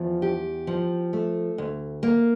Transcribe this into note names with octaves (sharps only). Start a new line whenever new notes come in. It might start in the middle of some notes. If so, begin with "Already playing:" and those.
Already playing: E2 F3
G4
F3
A3
D2
A#3